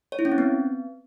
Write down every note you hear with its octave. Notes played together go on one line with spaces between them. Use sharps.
C#5
E4
C#4
C4
B3